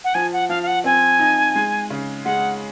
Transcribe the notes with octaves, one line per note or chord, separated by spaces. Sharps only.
F#5
F3 G#5
F#5
F3 F5
F5
F#5
C4 G#5
D#4
G#3
C#3
G#3 F#5